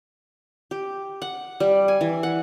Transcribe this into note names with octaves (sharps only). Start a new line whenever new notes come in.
G4
F#5
G3
G#5
E3
F#5